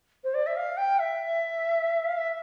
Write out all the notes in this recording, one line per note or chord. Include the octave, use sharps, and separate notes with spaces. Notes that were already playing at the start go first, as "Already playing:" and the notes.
C5
D5
E5
F5
G5
E5
F5
E5